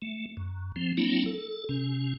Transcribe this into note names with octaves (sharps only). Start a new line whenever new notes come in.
A3
F#2
F3 C4
F#3 A#3 C4 D4 E4
A4
C3 C#4